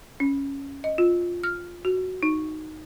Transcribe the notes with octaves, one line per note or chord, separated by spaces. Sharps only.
C#4
D#5
F4
F6
F#4
D#4